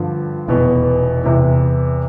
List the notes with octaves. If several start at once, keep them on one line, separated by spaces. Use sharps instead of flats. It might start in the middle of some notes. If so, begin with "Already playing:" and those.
Already playing: G2 D3 F3
F1 E2 B2 B3
E2 C3 E3